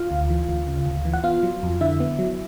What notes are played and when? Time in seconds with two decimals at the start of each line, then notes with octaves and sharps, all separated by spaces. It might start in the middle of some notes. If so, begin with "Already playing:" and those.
Already playing: F4 F5
0.11 D2
0.30 E3
0.49 D2
0.67 C#3
0.86 D2
1.05 E3
1.13 F#5
1.24 B3 F4 F5
1.43 F#3
1.63 F2
1.81 D3 E4 E5
2.00 B3
2.19 F#3